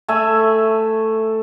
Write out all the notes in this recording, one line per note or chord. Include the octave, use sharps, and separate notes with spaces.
A3 E5 G#5